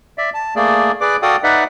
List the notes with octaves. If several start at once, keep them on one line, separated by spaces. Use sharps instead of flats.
D5 E5
A5
A3 A#3 G#4 D5
G#4 B4 D5 D6
F#4 A4 D5 F5 G5 D#6
D#4 B4 D5 E5 F#5